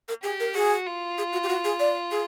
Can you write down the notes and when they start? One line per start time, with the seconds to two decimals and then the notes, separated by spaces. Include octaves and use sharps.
0.08 A#4
0.23 G4 G#4
0.40 A#4
0.55 F#4 G#4
0.86 F4
1.18 G#4
1.32 F#4
1.43 G4
1.48 F#4
1.64 G#4
1.80 D5
2.11 G#4